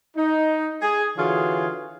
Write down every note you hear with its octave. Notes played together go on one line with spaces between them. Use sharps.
D#4
G#4
D3 E3 F4 F#4 G#4 C#5